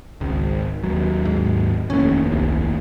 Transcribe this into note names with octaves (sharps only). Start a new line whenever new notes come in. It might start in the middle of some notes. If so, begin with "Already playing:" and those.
G#1 C#2
D#2 F#3
G#2
F1 D#2 A2 C#4
C2